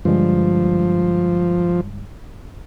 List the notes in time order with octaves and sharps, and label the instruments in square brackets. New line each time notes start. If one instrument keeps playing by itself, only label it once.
[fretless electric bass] G2 D3 G#3 [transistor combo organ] F3